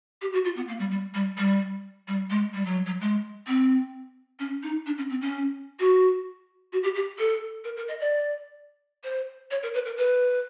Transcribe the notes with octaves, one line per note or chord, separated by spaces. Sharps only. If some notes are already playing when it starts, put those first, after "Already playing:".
G4
F#4
F4
B3
A#3
G3
G3
G3
G3
G3
G#3
G3
F#3
F#3
G#3
C4
C#4
D#4
D4
C#4
C4
C#4
F#4
F#4
G4
G4
A4
A#4
A#4
D#5
D5
C5
C#5
A#4
B4
A#4
B4